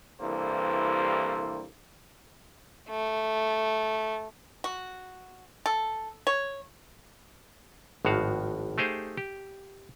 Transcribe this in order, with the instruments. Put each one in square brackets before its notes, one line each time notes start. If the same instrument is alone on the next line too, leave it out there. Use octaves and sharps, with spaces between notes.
[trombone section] C2 G2 E3 A#3 A4 C5
[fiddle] A3
[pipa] F#4
A4
C#5
[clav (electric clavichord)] G#1 A2 F3 F#4 F5
A3 D#4 G4 G#4 C5 F5
G4